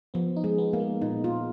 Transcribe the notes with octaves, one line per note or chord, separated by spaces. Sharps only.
F3 B3
D#4
G#3
B3
A#3
G#3
A#2 D#4
A#2 F4